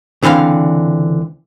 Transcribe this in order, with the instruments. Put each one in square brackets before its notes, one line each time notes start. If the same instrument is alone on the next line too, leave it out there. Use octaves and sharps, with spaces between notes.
[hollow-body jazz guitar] C#2 D3 E3 C4 F5